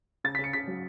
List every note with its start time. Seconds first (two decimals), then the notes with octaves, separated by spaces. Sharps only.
0.24 C#3 A6
0.35 B6
0.39 C#3
0.44 C#7
0.53 C#3 B6
0.68 F#3